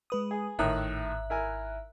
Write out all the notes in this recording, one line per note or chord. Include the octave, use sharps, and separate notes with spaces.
G#3 B4 D#6
G#4
G#1 A2 D#3 E5 F#6
E4 A#4 G#5